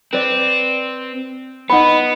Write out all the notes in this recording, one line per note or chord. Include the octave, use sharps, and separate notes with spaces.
C4 B4 D5
B3 D#4 F#5 B5